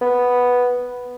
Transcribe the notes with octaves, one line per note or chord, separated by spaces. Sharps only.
B3